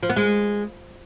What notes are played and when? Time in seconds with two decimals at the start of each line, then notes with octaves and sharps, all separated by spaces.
0.03 F3
0.09 B3
0.16 G#3